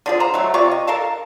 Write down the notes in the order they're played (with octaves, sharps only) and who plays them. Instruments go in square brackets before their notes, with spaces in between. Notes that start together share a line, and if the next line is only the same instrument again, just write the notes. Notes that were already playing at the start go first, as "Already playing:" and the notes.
[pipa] D3 F3 G#4
C5 A#5
F#3 G#3 A3
C3 F4 D5 C#6
D#5
A4 A#4 F5 A5